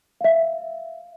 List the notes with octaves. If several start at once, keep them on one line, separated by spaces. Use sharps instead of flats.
E5 F5